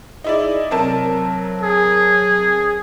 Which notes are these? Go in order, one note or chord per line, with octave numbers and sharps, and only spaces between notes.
D#4 E4 G#4 D5
C3 F#3 A#4 A5
G#4